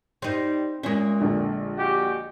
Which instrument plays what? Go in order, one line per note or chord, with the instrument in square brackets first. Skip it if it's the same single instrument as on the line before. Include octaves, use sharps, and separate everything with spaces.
[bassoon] G3 [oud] C4 D#4
[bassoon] A#2 [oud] G#3 E5 [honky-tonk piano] C#4
[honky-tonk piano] A#1 D3
[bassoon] G#3 [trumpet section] F#4 G4